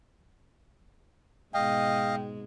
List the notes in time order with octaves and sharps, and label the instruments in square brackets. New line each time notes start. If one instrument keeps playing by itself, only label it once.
[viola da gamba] G#2 B2 G#3 [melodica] D#5 F5 [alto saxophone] G5